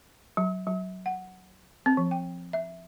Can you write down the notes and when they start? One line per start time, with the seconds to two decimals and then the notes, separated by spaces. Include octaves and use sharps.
0.37 F#3
0.67 F#3
1.06 F#5
1.86 C4
1.97 F3
2.11 G5
2.53 E5